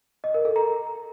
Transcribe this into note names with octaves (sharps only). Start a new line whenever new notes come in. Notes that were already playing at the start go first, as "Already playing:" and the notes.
D#5
A#4
A4
A#5